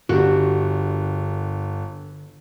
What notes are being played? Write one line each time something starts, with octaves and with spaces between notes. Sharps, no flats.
G1 D3 D4 F#4 G4 A#4